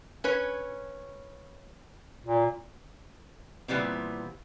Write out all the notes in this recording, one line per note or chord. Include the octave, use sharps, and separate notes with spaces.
C#4 B4 C#5
A#2
A#2 E3 G3 B3 C4